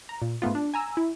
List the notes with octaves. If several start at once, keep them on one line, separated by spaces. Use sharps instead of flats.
A#5
A#2
G#2 A3 B3 F4
D4
G#5 A#5 E6
E4